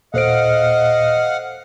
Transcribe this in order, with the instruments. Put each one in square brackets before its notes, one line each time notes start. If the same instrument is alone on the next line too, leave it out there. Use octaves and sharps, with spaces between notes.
[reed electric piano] D#2 A#2 [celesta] A4 C5 D7 [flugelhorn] D#5 [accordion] F5 F#5